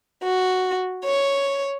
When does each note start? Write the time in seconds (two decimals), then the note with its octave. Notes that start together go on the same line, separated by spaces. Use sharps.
0.22 F#4
1.04 C#5